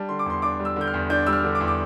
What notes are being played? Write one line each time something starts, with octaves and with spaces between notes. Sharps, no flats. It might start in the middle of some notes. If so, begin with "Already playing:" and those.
Already playing: G3 D4 A5
D3 C6
D6
E2 C6
D4 D6
G3
E6
D3 G6
F6
E2
D4 G6
G3 E6
F6
D3
D6
E2
D6